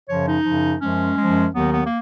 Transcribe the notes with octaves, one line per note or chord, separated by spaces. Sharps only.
F#2 C#3 F3 C#5
D#4
F#2 C#3 F3
F#2 F3 G#3 C#4
F#2 F3 G#3
D#2 D#3 F#3 B3
B3
A#3